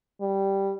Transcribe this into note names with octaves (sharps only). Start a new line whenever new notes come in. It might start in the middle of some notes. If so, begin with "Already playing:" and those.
G3